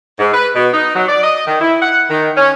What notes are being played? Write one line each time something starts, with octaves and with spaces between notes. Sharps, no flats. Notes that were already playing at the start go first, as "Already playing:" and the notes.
G#2
B4
B2
D#4
F#3
D5
D#5
D#3
E4
F#5
D#3
C#4